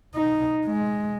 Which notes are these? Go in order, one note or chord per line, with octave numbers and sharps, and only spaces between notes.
D#4
G#3